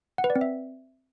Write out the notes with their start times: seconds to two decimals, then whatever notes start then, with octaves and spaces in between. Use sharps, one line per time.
0.18 F#5
0.24 B4
0.30 D5
0.36 C4
0.41 E5